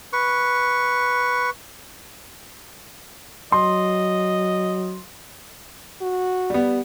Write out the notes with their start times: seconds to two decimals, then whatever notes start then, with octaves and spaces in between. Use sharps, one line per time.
0.13 B4 C#6
3.52 F#3 D#5 C6
6.01 F#4
6.50 G3 B3